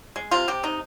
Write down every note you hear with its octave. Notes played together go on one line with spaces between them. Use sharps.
G#3
C3 F4
C3 G4
C3 D#4